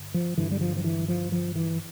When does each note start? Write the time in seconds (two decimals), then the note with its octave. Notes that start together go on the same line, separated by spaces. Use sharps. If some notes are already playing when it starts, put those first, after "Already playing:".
Already playing: G2 D3
0.14 F3
0.38 G2 D3 E3
0.51 G3
0.61 F3
0.77 F3
0.84 E3
1.08 F3
1.32 F3
1.55 E3